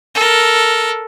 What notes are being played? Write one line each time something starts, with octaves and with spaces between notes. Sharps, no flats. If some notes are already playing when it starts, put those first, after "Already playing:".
A4 A#4